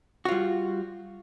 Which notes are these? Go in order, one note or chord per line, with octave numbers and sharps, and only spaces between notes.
G3 F4 F#4